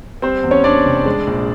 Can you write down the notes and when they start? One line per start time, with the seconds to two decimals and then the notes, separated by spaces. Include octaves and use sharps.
0.22 G3 C4 C5
0.43 E2
0.51 C#4 C#5
0.64 E2 D4 D5
0.85 F1
1.06 G#3
1.27 A#1